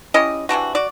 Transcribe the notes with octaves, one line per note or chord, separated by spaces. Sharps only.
C#4 E4 G4 D#5
C3 E3 D4 F#4
F#4 D5